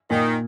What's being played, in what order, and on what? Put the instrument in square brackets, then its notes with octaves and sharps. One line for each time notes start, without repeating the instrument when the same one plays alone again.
[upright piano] A#2 [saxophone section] D#3